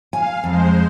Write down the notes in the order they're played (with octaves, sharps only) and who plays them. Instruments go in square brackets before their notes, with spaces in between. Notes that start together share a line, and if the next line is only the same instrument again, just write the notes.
[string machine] F5 [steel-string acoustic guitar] G#5
[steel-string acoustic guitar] F2 [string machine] G#3 C5